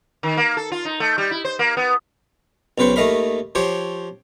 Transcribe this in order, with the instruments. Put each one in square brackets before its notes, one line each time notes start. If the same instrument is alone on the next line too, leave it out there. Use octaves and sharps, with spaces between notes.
[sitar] D#3
A#3
A4
F4
D#4
A3
G3
E4
C5
A#3
B3
[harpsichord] B1 C#3 B4 C5 C#6
D#2 A3 D#5 F5 B5
F3 G4 C5 C#5